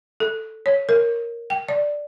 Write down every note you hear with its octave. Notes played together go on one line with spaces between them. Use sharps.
A4
C#5
A#4
G5
D5